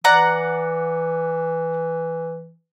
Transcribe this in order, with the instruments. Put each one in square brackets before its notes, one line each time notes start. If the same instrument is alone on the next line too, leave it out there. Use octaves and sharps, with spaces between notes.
[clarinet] E3 [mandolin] D5 F#5 A#5